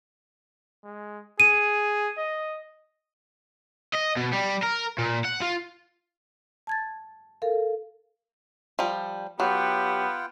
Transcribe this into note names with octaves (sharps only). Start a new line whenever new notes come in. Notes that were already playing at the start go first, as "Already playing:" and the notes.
G#3
G#4 D#7
D#5
D#5
B2
G3
A#4
A#2
F#5
F4
A5 G#6 A6
A4 A#4 F5
F3 G3
F#3 B3 F4 G4 F#5 G5